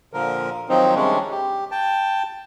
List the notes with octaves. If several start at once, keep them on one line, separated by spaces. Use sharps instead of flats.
A#2 D3 F3 A#4
D#3 F3 F#3 C4 D#4
C3 D#3 G3 G#3 C#4 D4
G4
G5 A5